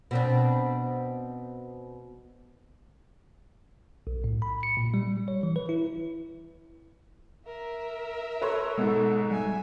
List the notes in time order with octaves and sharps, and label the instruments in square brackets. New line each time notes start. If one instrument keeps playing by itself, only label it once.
[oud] B2 C4 D4
[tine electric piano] B1
A2
B5
C#7
A#2
G3
C#5
E3
B4
E4
[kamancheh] A#4 E5
[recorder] A4 [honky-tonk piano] B4 C#5 C6
[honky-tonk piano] G#2 B2 [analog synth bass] G#3
[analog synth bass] G3 [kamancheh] E5 G#5